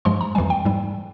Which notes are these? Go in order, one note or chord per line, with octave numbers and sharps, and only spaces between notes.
G2 F3 G#3 C6
A#5
F2 E3 G3 G#5
G5
G#2 G3